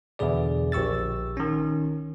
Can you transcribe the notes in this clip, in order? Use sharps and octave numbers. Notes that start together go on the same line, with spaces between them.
E2 B2 D3 G#4 D5
A#1 G4 C#6 E6 A6
D#3 C#4